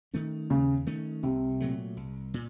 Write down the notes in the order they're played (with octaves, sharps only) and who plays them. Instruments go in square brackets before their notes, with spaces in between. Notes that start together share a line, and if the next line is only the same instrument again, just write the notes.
[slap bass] D#3 A3 C#4
[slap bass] D#2 [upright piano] C#3
[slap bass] D#3 A3 C#4
[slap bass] C2 [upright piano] C3
[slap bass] A#2 F#3 A3
C2
A#2